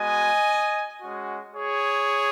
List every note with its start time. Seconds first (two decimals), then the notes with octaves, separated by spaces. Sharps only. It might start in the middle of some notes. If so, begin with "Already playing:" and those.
Already playing: G#3 B3 F#4 D#5 G#5
1.01 G#3 C#4 F#4
1.55 G#4 C#5